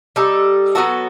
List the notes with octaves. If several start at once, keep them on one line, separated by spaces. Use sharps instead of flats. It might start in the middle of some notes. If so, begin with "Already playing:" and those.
G3 D#4 A4
F#3 B3 F#4 A4